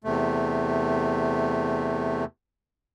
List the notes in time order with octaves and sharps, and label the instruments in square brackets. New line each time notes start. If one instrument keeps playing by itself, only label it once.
[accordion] E2 C3 A3